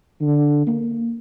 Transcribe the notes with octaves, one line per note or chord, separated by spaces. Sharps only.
D3
A#3